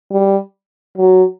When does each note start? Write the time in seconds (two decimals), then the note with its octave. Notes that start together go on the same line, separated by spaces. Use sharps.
0.11 G3
0.97 F#3